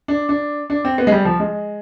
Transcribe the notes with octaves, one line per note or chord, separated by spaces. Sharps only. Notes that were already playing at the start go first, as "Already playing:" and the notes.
D4
D4
D4
C4
B3
G#3
G3
F3
G#3